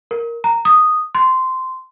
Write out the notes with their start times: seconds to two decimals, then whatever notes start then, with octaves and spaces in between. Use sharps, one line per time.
0.11 A#4
0.44 A#5
0.65 D#6
1.15 C6